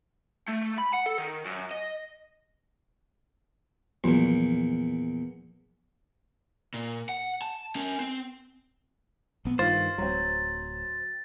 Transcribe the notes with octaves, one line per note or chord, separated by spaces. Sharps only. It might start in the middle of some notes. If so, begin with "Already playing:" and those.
A3
B5
F#5
A4
D#3
F#2
D#5
E2 A#2 F3 F#3
A#2
F#5
A5
C#4 A#4
C4
A#1 B3
G2 D#3 F4 C5 A6
D1 F#3 C4